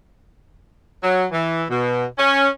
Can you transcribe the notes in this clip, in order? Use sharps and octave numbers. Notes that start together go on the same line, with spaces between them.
F#3
E3
B2
C#4